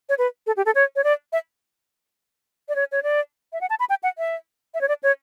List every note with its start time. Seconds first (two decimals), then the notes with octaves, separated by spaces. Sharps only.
0.09 C#5
0.18 B4
0.47 A4
0.57 G4
0.66 A4
0.75 C#5
0.96 C#5
1.04 D5
1.33 E5
2.69 D5
2.76 C#5
2.92 C#5
3.03 D5
3.53 E5
3.61 F#5
3.70 A5
3.80 B5
3.90 G5
4.03 F#5
4.18 E5
4.74 E5
4.81 C#5
4.88 D5
5.03 C#5